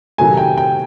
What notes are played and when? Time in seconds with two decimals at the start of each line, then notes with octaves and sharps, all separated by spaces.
0.18 C3 D#3 F#3 A3 G#5
0.37 G5
0.57 G5